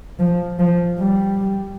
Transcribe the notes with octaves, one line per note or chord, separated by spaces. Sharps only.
F3
F3
G3